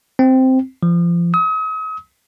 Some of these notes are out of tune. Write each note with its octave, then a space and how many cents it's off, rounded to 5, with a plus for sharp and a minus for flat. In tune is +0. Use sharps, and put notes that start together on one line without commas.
C4 -5
F3 -30
D#6 +40